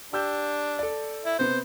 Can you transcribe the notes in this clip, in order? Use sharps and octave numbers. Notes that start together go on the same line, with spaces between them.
D4 G4 E6 G6
A4 D5
E4
C3 B3 C5